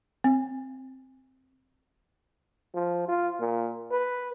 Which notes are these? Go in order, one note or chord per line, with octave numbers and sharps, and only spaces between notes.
C4
F3
F4
A#2
B4